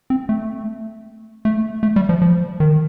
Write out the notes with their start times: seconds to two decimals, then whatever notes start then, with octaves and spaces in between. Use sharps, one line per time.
0.10 C4
0.29 A3
1.45 A3
1.83 A3
1.96 G3
2.09 F3
2.22 F3
2.60 D#3